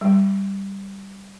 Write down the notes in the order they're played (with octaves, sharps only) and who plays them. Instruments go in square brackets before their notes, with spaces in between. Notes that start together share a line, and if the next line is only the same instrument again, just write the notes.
[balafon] G3